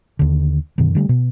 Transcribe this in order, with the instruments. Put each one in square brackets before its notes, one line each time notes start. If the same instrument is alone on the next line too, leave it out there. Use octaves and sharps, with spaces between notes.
[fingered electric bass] D#2 D3
F#2 B2 D3 D#3
D3 G3 A3
B2